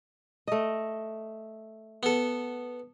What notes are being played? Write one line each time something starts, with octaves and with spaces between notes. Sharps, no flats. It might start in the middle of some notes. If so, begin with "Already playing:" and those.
A3 D#5
B3 A4